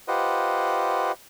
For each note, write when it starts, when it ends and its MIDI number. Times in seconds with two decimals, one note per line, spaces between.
0.08 1.12 65
0.08 1.12 67
0.08 1.12 71
0.08 1.12 72
0.08 1.12 75
0.08 1.12 78